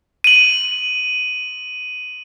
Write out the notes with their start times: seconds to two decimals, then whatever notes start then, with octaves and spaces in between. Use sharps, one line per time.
0.24 D#7 F#7